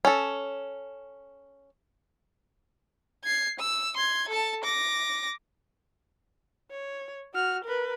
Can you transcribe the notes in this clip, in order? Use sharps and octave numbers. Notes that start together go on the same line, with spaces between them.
C#4 A4
G#6 C7
E6
C6 G#6
A4 A5
D6 A#6
C#5
F#4 F6
A#4 B4